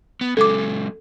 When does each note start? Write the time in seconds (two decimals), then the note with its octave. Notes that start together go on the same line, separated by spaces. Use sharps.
0.21 B3
0.37 F#3 G#3 C#4 A4 D6